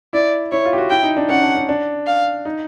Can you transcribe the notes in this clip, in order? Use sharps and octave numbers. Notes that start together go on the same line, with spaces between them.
E4 D5
E4 C#5
F4
G4
F#4
E4 G5
D#4
D4
C#4 F#5
D4
C#4
D4
F5
D#4